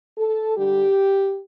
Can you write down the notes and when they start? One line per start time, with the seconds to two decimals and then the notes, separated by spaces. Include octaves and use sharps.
0.18 A4
0.57 D3 G3 G4